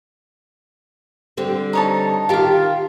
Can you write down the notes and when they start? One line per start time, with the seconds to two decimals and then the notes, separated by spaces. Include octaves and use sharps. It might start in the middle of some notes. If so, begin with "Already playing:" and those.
1.37 D3 G3 C4
1.73 D#4 C#5 A5
2.29 D#3 F4 G4 F5